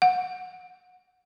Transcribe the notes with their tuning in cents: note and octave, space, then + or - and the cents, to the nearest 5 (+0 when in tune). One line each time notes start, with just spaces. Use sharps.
F#5 -25